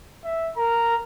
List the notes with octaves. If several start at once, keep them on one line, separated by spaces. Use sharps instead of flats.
E5
A#4 A#5